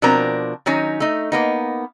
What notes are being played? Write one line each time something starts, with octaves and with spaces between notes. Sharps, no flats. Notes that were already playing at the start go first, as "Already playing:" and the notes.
B2 F3 C4 D4 A#4 A#5
D#3 F#3 C#4 D#4
A3 D#4
A#3 B3 D#4